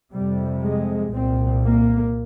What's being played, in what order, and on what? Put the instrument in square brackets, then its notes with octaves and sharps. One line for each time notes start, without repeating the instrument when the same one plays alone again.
[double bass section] F2 C3 G3
G#3
C2 A#2 C4
A#3